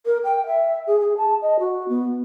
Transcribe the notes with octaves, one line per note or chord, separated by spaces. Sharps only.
A#4
G5
E5
G#4
G#4
A5
D#5
F#4
B3